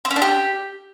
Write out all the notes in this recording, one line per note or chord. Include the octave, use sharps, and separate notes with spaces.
C4
C#4
D4
G4